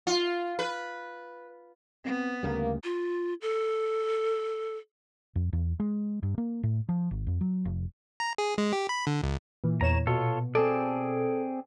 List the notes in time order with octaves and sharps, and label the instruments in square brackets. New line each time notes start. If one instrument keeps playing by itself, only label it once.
[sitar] F4
B4
[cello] B3 [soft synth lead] C4
[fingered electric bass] D2 C#3 G3 [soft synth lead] A3 [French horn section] A#3
[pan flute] F4
A4
[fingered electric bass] F2
E2
G#3
G2
A#3
A2
F3
G#1
F2
F#3
F1
[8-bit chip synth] A#5
G#4
G#3
G4
B5
D3
C#2
[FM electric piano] A#2 [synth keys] E3
[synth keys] E2 C#5 E7 [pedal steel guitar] A#5
[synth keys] B2 [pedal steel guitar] F4 A4 C#5
[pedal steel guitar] C4 G#4 D5 [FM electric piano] A4